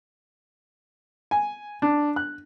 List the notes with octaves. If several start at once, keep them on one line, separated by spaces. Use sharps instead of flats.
G#5
D4
F#6